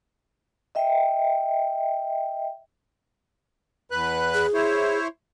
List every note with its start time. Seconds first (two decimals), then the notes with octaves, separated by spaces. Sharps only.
0.75 D#5 E5 G5
3.91 E2 B4 F#6
4.34 G#4
4.54 E4 C5 C#5